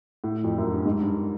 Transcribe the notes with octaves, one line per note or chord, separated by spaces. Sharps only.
A2
F2
F#2
G2
G#2
G2